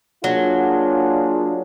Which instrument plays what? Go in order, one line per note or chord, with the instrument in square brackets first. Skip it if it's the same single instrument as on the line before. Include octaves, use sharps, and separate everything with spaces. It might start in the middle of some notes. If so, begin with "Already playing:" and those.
[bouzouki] F#3 [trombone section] A#3 D4 F4 G#4